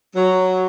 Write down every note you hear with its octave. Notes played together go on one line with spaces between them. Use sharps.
F#3